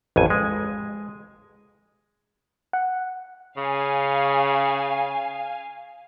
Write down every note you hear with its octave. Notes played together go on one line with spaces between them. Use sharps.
A1 F2 G#5
G#3
F#5
C#3 F5 G#5